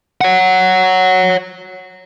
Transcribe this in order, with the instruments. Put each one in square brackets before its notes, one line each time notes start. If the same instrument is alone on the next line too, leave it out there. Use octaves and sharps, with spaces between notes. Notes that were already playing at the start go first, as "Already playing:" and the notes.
[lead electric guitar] C#5 F#5